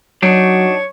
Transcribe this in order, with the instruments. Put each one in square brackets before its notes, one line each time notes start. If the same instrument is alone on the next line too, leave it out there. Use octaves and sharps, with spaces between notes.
[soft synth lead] F#3 [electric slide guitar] D4 D#4 [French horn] F#4 [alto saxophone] C#5